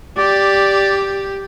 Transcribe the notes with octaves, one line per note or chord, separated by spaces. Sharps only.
G4 D5